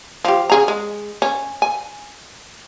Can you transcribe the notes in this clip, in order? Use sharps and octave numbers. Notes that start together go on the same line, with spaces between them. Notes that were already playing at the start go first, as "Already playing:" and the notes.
F3 G4
C#3 G#4 A#5
G#3
C#4
G#5